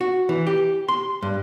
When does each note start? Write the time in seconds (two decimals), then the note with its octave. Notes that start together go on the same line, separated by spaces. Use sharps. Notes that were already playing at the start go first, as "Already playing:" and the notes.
0.01 F#4
0.29 E3
0.47 G4
0.88 C6
1.22 G2